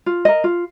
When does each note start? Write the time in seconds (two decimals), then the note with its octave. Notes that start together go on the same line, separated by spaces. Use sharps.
0.06 F4
0.25 A#4 D#5
0.44 F4